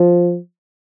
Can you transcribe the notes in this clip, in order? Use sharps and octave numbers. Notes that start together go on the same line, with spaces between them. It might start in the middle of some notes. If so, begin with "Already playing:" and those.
Already playing: F3